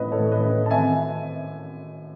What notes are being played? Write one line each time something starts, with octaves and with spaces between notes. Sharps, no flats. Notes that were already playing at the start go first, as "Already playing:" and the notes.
Already playing: A1 A2 B4 D#5
A4 C#5
A2
B4 D#5
A1
A5
G#1 E5 G#5